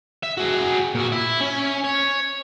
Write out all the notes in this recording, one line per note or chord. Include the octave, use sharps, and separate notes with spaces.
E5
F#4 G#4
A#2 F#4
E4
C#4
C#5